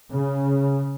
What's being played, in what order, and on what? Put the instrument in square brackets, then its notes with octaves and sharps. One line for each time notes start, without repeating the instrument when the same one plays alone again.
[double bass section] C#3